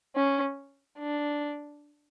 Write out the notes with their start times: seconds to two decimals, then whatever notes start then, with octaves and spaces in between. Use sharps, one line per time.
0.16 C#4
0.99 D4